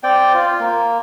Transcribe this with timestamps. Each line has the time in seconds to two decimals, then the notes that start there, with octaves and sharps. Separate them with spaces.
0.04 C4 D5 G5
0.34 F4
0.60 A#3